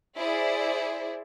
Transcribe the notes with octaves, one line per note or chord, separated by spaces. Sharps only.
E4 G#4 C5 D5